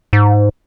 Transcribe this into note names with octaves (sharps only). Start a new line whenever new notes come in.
G#2